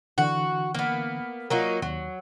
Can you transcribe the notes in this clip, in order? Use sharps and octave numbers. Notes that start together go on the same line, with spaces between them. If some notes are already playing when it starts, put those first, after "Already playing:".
D3 E3 F#4
A#3 B3
F#3 A#3 D#4 F4 A#4
D#2 F#3